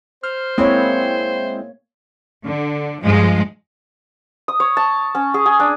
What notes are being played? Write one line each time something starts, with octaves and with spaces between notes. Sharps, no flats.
C5 F6
G#3 A#3 C4 E4 C#5
D3
G2 F3 G#3
D#6
C#5
A5
C#4
G#4
G#4
D4